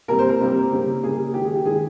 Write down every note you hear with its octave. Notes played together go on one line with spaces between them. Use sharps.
C3 G3 A#3 A#4
C5
A#4
C3 G3 A#3
C#3 G3 A#3
C#3 G3 A#3 G#4
D#3 G#3 G4
G#4
G4
D#3 G#3 G#4